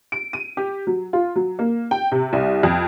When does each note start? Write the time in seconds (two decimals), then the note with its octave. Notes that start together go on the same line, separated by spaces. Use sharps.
0.12 D7
0.33 D#7
0.57 G4
0.87 F#3
1.13 F4
1.36 F#3
1.59 A#3
1.91 G5
2.12 C3
2.33 C2
2.63 F2